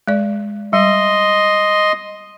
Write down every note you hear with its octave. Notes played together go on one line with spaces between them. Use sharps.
G#3 D5
G3 D#5 C6